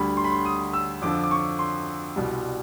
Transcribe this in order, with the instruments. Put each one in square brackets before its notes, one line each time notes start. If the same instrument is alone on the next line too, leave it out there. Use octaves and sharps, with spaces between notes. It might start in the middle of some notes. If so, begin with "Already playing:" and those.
Already playing: [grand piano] D2 D3 G3 B5
C6
B5
C6
D#6
E6
F2 D3 F3 D6
D6
C#6
C6
C2 B2 G3